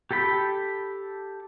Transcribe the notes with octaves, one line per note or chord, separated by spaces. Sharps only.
G4 A4 G5 B5